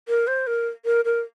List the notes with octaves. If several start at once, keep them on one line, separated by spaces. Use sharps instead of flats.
A#4
C5
A#4
A#4
A#4